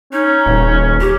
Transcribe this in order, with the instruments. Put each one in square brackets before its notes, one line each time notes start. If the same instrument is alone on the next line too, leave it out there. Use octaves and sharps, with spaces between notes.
[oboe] C#4 [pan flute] D#4
[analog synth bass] D#1
[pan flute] G4